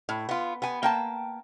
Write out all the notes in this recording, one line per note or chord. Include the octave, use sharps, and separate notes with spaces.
A2
B3 F4
B3 G#5
A#3 G5 A5